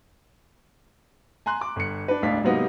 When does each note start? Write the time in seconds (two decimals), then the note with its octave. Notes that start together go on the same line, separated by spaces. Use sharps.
1.46 G#5 A#5 C6 F#6
1.61 D6
1.76 G1 C#7
2.08 D4 B4
2.22 E1 A1 D2 D4 F5 B6
2.43 G#2 C3 F#3 A#3 B3 D#4